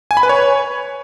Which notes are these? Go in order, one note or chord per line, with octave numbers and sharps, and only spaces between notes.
G#5
B5
B4
C#5